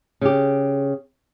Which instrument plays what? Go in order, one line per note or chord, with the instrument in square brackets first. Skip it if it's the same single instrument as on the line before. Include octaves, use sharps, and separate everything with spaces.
[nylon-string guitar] C#3 G4